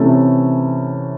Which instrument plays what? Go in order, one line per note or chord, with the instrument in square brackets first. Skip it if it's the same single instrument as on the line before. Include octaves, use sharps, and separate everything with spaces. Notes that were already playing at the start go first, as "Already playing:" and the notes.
Already playing: [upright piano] C3 E3 A3 C#4 E4